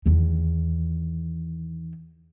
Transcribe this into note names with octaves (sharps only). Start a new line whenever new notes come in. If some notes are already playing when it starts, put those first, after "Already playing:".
E2 D#3